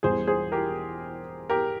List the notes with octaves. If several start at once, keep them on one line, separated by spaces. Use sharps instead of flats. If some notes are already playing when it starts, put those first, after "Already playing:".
E1 E2 E3 G3 G#4 C5
G#4 C5
G4 A#4
G4 A#4